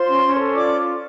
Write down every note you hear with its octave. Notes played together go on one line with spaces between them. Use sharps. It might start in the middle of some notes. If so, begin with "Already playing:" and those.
Already playing: F4 C5 C6
C#4
C#4
A4
F4 D5 D6